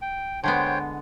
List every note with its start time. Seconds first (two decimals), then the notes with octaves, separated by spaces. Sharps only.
0.02 G5
0.44 D3 G#3 B3 C5 C#5 G5